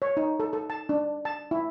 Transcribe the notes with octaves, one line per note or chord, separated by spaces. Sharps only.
C#5
D#4
A4
A4
A5
D4
A5
E4